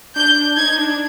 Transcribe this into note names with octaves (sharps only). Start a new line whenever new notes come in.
D4 G6
D#4 G#6
D4